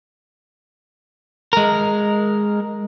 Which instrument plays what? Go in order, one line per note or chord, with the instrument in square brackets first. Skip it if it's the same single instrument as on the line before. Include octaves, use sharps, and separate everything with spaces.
[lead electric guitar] G#3 A#4